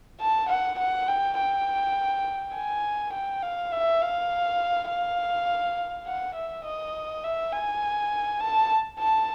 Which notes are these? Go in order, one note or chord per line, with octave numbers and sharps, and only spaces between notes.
A5
F#5
F#5
G5
G5
G#5
G5
F5
E5
F5
F5
F#5
E5
D#5
E5
G#5
A5
A5